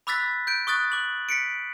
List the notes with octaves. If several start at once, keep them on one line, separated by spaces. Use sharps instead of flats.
B5 D6 E6 F#6 A6 B6
G6 D7
C#6 D#6 F#6 A6
D6 F#7
B6 C#7 D7